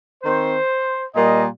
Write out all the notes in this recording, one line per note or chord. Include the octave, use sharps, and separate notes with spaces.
D#3 C4 C5
A#2 G3 A#3 D#5